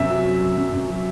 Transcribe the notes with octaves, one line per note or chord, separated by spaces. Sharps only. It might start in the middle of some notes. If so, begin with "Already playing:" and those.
Already playing: F#2 C3 E5
F#3
F#3
F#2
F#2
F#2
F#3